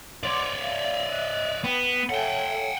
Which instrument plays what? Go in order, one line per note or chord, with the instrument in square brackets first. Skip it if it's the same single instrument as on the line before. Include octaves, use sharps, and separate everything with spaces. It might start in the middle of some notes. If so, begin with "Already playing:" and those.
[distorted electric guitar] C#5 D5 [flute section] F#5 C6 D6
[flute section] E5 F5
D#5 E5 F#6
[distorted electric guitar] B3 [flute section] G5
[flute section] A4 C#5 E5 [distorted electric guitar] F#5 G5